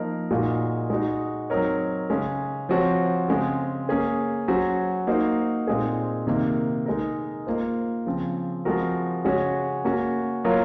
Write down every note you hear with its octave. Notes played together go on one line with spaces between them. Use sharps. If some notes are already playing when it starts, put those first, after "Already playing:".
Already playing: F3 A#3 D#4 A#4
A#2 G#3 D#4 F#4
G#3 D#4 F#4
F#3 C4 D#4 A#4 C#5
C#3 G#3 C#4
F3 C4 F#4 C#5
C#3 G#3 C4
A#3 C#4 G#4
F#3 C#4 F#4 C5
A#3 D#4 F#4 C5
A#2 G#3 C4 D#4 G#4
C3 D#3 A#3
G#3 D#4 A#4
A#3 F4 C5
C#3 F3 C4
F3 G#3 C4 F#4 A#4
C#3 G#3 C#4 F#4 C#5
A#3 C#4 F#4
F#3 A#3 F4 A#4 C#5